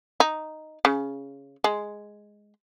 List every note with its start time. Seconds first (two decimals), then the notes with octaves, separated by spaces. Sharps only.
0.20 D#4
0.85 C#3
1.64 G#3